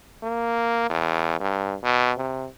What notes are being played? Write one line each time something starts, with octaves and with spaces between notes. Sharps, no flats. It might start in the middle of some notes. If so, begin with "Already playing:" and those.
A#3
E2
G2
B2
C3